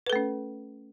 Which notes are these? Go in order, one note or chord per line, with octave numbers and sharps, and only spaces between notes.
A3 C#4 A4 B4